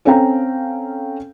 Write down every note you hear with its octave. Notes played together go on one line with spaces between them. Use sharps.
C4 C#4 A4 F5 G5 A#5